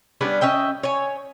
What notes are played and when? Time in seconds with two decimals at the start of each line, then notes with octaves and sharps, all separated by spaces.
0.21 G3 B3 C#4 D4
0.41 C#4 D#5 E5 G5
0.83 C#5 G#5